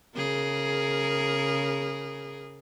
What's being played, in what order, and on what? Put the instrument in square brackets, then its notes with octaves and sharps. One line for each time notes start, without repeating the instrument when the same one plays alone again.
[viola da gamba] C#3 G#4 A#4